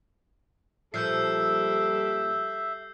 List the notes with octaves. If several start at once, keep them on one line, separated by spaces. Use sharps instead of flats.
A#2 F3 G3 A4 E5 E6 G6 C7